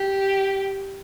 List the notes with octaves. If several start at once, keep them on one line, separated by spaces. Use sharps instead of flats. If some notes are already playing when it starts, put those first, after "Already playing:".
Already playing: G4